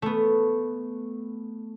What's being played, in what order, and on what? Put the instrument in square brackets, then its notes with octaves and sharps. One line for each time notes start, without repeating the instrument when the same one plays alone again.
[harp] A3 B3